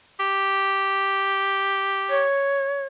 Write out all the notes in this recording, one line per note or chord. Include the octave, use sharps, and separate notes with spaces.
G4
C#5